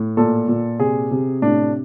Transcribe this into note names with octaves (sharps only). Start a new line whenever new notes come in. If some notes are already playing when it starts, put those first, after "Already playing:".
Already playing: A2
A#2 A4
A#2
C3 G#4
C3
A2 D4